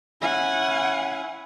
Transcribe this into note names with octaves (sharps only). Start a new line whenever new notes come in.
C#4 E4 F#5 G#5